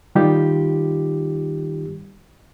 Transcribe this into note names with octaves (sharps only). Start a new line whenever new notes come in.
D#3 G3 D#4 F4 G4